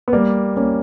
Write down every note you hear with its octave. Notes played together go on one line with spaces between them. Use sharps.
B3
G3 A#3
A#3 C#4